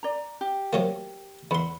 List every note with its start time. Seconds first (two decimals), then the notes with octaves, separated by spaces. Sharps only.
0.03 D5 A#5
0.41 G4
0.73 C3 F#3 A#3
1.51 E2 F#5 B5 C6